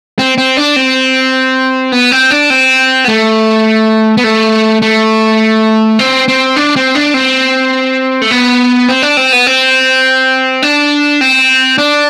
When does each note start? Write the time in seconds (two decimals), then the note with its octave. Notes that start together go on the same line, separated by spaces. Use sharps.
0.19 C4
0.38 C4
0.57 D4
0.76 C4
1.92 B3
2.11 C4
2.31 D4
2.50 C4
3.05 B3
3.08 A3
4.17 B3
4.24 A3
4.82 A3
5.99 C4
6.28 C4
6.56 D4
6.76 C4
6.95 D4
7.14 C4
8.22 A3
8.31 B3
8.89 C4
9.02 D4
9.17 C4
9.33 B3
9.47 C4
10.62 D4
11.21 C4
11.78 D4